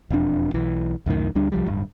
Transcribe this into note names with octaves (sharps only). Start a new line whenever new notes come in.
E1 F2 D4
B1 E3
C#2 F#2 A2 D#3
D2 G3 D4
C2 F3 G3
D1 G2